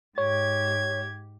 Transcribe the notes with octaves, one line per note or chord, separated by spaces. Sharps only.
G#2 G4 C#5 G#6